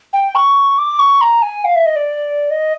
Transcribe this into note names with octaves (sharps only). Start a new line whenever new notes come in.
G5
C#6
D6
C#6
A#5
G#5
F5
E5
D#5
D5
D#5